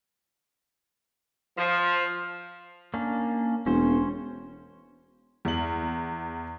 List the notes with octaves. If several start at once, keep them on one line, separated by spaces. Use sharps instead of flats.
F3
A#3 C#4 D4
E1 C#4 C5
E2 F#7